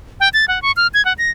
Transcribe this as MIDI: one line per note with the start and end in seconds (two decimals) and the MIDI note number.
0.20 0.29 79
0.34 0.45 93
0.48 0.61 78
0.62 0.72 85
0.77 0.87 89
0.94 1.04 92
1.05 1.13 78
1.18 1.31 94